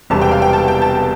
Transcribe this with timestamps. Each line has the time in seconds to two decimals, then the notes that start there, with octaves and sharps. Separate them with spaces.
0.10 E1 E2 C3 G3 A5
0.22 G5
0.31 F5
0.42 G5
0.53 A5
0.68 G5
0.82 A5